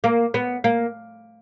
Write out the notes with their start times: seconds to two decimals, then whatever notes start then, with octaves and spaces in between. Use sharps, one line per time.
0.04 A#3
0.34 B3
0.64 A#3